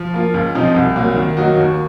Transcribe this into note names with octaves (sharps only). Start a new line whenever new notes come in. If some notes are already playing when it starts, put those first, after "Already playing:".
Already playing: F3
A#3 F4
C#2
C3 F3 C4 D#4
C2
A#2 F#3 A#3
D#3
F#3 A#3 D#4 F#4
D#2